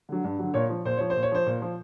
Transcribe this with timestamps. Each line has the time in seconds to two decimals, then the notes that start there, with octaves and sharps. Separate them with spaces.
0.09 D3 F#3
0.24 G2
0.39 D3 F#3
0.54 A#2 C#5
0.69 F3
0.85 A#2 C5
0.97 F3 C#5
1.10 C5
1.16 A#2
1.23 C#5
1.32 F3 C5
1.47 A#2
1.62 F3